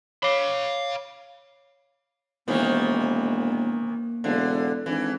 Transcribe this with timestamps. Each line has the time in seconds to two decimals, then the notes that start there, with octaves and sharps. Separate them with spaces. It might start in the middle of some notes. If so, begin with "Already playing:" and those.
0.23 C#5 F5 B5 D6 G7
2.48 E1 C3 D#3 E3 A#3
4.24 E1 D3
4.86 G#1 E3 D4